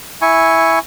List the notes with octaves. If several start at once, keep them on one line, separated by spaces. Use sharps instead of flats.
E4 G#5 C#6